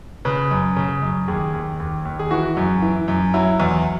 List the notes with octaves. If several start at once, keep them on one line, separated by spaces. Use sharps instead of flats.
C#3 B4
F#2
C#3
F#2
D#2 G#4
D#2
D#2
D#2
G#4
E3 F#4
F#2
E3
F#2
F#3 E4
E2